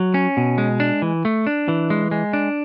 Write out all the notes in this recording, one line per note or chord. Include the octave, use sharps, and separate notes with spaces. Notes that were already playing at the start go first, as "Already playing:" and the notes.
Already playing: F#3
C#4
B2
G#3
D4
E3
A3
D4
E3
G#3
G#3
D4